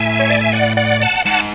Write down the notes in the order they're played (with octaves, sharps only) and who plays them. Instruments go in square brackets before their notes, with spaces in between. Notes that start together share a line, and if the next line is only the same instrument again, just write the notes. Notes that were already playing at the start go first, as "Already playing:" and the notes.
Already playing: [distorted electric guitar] A2 [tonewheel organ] E5 G#5
[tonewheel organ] C#5
D5
E5
D5 F#5
D5 F#5
F#5 A5
[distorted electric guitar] G#2 [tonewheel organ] F#5 A5